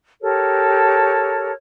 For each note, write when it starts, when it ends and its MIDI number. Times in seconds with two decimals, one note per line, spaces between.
0.22 1.52 67
0.22 1.52 69
0.22 1.52 70
0.22 1.52 73